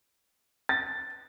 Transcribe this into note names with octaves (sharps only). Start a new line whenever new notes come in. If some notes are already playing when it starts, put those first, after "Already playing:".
A6